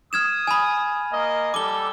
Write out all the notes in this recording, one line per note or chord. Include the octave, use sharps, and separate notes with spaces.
D#6 F6 G#6 E7
G#5 B5
A#3 D#5
G3 A4 D6 G7